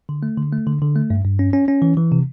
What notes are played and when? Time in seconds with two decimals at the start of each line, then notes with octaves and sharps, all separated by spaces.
0.09 D3
0.23 A3
0.37 D3
0.52 A3
0.67 D3
0.82 D3
0.95 A3
1.10 G2
1.24 G2
1.39 C#4
1.53 C#4
1.68 C#4
1.82 E3
1.97 E3
2.12 C3